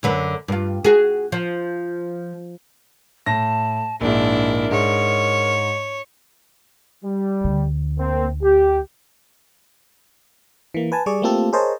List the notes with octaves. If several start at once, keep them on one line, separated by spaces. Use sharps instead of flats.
F#2 D3 B4
G2 F4
F#4 G#4
F3
A2 A5 A#6
A#1 G#2 D4 E4 A#4
G#2 C#5
G3
D2 D3
A#3 C4
G4
E3 A#3
B4 G#5 A5
G3 G#4 D5 C#6
A3 A#3 C4 F4 G4 A4
G#4 A#4 C5 C#5 D#5 A5